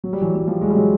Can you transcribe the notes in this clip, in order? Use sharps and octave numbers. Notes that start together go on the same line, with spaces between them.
F#3
G3
E3 F#3
F#3
F3 G3
F#3 G#3
G3
F#3 G#3